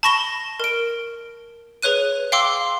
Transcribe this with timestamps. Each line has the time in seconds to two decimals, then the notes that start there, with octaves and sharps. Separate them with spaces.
0.03 A5 B5 C#6 A#6 E7 G7
0.60 A#4 D7
1.82 G#4 B4 C#5 F#6 D#7
2.32 F5 G5 C6 D6 E6